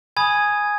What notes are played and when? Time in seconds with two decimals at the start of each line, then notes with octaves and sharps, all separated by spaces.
0.17 G#5 B5 D#6 G#6